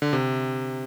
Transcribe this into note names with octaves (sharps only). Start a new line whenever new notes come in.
D3
C3